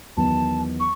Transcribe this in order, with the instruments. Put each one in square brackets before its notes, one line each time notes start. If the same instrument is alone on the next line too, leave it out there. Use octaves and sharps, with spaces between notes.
[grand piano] E2 D#3 F#3 B3 [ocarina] A5
[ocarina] C#6